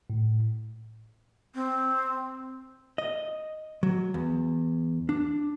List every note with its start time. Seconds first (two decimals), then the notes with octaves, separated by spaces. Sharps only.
0.10 A2
1.55 C4
2.98 D#5
3.83 F#3
4.14 E2
5.09 D4